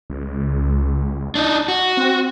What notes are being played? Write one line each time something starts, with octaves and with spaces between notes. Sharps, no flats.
C#2
D4 D#4
F#4
C4